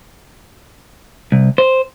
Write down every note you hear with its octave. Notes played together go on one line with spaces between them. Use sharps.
C2
C5